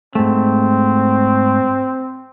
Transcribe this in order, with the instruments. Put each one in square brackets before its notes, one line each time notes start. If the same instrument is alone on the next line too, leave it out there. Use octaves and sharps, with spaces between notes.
[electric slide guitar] G#2 A3 [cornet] C4